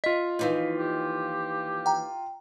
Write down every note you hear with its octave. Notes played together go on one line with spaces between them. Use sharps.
F4 D#5 B6
D#2 E3 F3
G4
G5 A#5